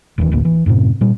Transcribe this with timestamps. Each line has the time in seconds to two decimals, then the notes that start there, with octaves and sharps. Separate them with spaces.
0.18 E1 D#2 D#3 E3
0.32 D1 A1 D2 A#3
0.45 E3
0.66 F#2 A2 C3
1.01 A#2 G3